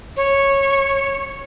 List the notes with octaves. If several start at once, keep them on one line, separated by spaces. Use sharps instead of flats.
C#5